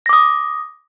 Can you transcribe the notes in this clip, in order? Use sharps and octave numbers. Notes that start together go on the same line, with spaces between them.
D6 D#6 A#6